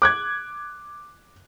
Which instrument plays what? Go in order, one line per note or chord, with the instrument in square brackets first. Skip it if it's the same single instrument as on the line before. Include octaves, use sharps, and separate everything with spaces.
[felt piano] D6 F#6 G#6